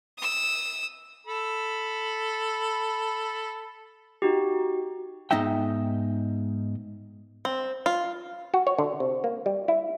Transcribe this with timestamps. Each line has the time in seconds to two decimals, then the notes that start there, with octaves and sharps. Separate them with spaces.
0.18 D#6 E6
1.27 A4 B5
4.22 D#4 F#4 G4
5.31 G#2 B3 D#4 D#5 E5 G5
7.45 C4
7.86 F4
8.54 F#4
8.67 C#5
8.79 D3
9.00 C3
9.24 A#3
9.46 G3
9.68 E4